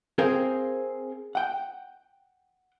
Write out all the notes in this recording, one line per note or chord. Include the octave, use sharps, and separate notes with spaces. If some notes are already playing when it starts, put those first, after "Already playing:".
C4 G#4 A#4 C5 F5 G5
F#5 G5